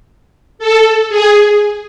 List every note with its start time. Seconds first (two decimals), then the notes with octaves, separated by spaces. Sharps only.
0.59 A4
1.09 G#4